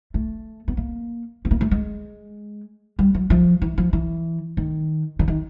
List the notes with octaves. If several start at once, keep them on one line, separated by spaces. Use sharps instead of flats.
A3
B3
A#3
B3
A#3
A3
G#3
G3
F#3
F3
E3
F3
E3
D#3
D3
D#3